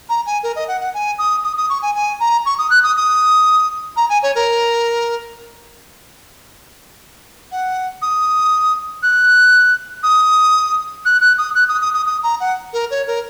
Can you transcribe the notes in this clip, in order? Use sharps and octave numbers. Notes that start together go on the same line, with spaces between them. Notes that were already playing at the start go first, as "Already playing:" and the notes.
A#5
G#5
A#4
D#5
F#5
F#5
G#5
D#6
D#6
D#6
C#6
G#5
G#5
A#5
C#6
D#6
F#6
D#6
D#6
A#5
G#5
C#5
A#4
F#5
D#6
F#6
D#6
F#6
F#6
D#6
F#6
D#6
D#6
D#6
D#6
A#5
F#5
A#4
C#5
A#4